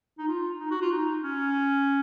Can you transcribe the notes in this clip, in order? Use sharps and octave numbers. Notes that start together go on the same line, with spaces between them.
D#4
F4
D#4
F#4
F4
D#4
C#4